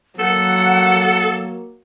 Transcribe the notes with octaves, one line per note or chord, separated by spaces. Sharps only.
F#3 A#3 A4 F#5